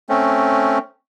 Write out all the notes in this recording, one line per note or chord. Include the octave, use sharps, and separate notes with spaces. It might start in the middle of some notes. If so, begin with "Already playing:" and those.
A3 C4 C#4